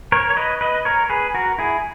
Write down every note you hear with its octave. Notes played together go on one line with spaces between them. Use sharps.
A#4 C#5
C#5
B4 D#5
B4 D#5
A#4 C#5
G#4 B4
F#4 A#4
E4 G#4